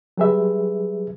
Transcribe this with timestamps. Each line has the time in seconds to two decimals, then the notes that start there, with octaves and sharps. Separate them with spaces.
0.17 F#3 G3 G4 G#4 B4 E5